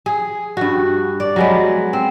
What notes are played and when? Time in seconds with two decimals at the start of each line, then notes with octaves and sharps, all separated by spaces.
0.06 G#4
0.57 G2 F#4
1.20 D5
1.36 F#3 G#3 B3
1.93 C4